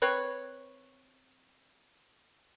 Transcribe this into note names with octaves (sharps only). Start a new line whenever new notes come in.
C4 B4 C#5